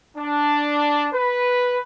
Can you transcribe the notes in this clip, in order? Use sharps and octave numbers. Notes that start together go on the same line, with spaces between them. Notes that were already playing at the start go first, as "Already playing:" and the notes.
D4
B4